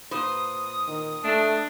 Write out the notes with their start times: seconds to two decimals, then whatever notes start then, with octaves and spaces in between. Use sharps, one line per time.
0.11 A#2 B4 C5 D#6
0.88 D#3
1.24 A3 D4